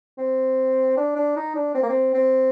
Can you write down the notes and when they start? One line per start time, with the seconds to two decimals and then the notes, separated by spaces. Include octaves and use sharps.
0.18 C4
0.97 D4
1.16 D4
1.36 D#4
1.55 D4
1.75 C4
1.83 A#3
1.89 C4
2.14 C4